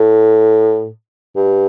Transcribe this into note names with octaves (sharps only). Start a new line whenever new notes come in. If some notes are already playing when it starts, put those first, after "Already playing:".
Already playing: A2
G2